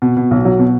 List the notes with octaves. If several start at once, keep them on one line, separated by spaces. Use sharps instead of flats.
B2
B2
B1
F#3
B2